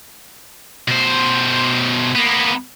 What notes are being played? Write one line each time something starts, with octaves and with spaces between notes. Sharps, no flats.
B2 C5
A#3 B3